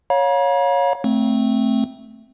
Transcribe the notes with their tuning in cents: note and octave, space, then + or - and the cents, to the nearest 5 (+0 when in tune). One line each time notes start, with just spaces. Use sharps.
C#5 +0 F5 +30 A#5 +45
A3 +0 C4 +0